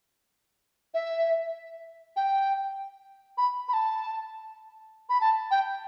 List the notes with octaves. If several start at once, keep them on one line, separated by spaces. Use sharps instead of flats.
E5
G5
B5
B5
A5
B5
A5
G5